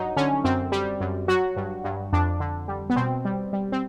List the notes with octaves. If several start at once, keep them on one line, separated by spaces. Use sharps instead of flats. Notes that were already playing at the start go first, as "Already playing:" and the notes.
Already playing: G2 F#3 D#4
D3 C#4
F#2 C4
G3
F#2
F#3 F#4
G2
G2
F2 D4
D3
G3
B3
B2 C4
G3
G3
C4